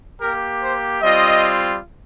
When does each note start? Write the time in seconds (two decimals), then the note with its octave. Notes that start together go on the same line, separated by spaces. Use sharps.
0.21 A#3 G4 A#4
0.61 C5
1.01 G3 C4 F4 D#5